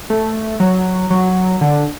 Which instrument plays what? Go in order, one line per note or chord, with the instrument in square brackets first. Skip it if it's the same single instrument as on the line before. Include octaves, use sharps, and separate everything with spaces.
[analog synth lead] A3
F#3
F#3
D3